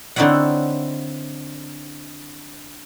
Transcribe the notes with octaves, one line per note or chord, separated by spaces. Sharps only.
D3 C4 D#4 E4 C#5 F#5